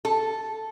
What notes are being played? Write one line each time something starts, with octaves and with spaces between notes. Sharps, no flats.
A4